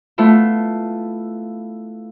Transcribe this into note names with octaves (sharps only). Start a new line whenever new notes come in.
A3 B3 E4 F4